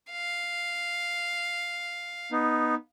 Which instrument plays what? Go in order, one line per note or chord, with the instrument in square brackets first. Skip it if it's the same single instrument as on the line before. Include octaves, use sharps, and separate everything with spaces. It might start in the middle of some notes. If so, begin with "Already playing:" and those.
[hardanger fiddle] F5
[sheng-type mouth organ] B3 D#4